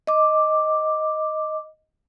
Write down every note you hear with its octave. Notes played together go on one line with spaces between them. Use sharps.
D#5 D6